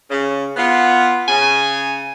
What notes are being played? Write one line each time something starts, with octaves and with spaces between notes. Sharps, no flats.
C#3
B3 F4
C#3 G#5